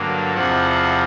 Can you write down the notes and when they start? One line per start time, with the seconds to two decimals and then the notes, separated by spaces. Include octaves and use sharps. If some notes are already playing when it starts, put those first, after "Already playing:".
Already playing: G2 D3 F#3 A#3
0.34 E2 C3 F3 F#5